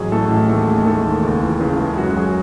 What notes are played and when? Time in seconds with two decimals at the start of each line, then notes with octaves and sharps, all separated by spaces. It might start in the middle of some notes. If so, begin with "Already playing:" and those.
Already playing: A1 F#3 G#4
0.12 A2 A3 A4
0.31 A1
0.49 D#2 A3 A4
0.68 G#3
0.86 D#3 A3 A4
1.05 D#2
1.24 C#2
1.42 E3
1.61 C#3
1.80 G#3
1.98 F#2 F#4
2.17 F#3 G#4